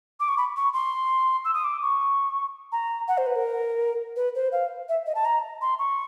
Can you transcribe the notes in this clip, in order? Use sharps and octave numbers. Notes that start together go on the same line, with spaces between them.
D6
C#6
B5
C#6
C6
E6
D#6
D6
C#6
A#5
F#5
C5
B4
A#4
B4
C5
F5
E5
D#5
A5
A#5
C6
C#6